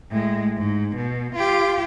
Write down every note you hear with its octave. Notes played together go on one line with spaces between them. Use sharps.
A2 G#3
G#2
B2
F4 G4